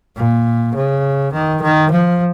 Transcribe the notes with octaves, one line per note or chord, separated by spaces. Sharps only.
A#2
C#3
D#3
D#3
F3